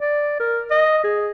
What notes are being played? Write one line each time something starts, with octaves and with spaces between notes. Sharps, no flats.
D5
A#4
D#5
G#4